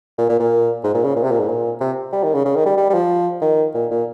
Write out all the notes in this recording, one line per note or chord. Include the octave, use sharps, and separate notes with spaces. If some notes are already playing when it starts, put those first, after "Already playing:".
A#2
A#2
A#2
G#2
A#2
C#3
A#2
C3
A#2
G#2
A#2
C3
G3
D#3
C#3
C#3
D#3
G3
G3
G3
F3
D#3
A#2
A#2